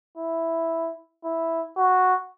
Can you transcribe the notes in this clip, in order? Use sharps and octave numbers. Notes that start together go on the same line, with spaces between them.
E4
E4
F#4